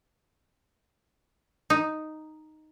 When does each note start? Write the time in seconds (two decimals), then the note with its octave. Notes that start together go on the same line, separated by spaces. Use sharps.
1.70 D#4